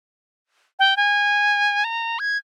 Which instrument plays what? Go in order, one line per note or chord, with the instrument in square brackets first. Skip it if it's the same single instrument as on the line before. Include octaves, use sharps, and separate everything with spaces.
[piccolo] G5
G#5
A#5
G#6